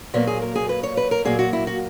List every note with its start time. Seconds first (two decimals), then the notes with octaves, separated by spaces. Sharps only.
0.14 A#2 F#3 A#3 B3
0.27 G#4
0.42 A#4
0.56 G#4
0.69 B4
0.83 C#5
0.97 B4
1.11 A#4
1.25 A#2 F#3 A#3 G#4
1.39 F#4
1.53 E4
1.67 F#4